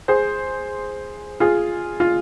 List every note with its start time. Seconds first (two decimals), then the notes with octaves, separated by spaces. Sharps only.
0.08 G#4 C5
1.40 F4 G#4
2.00 F4